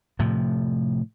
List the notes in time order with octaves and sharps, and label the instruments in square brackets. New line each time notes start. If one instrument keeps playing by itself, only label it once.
[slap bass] A2 C3 F3